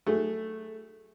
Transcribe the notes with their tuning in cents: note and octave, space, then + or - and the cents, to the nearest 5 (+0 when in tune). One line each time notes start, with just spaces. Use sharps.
F#3 +15 A3 +0 G#4 -10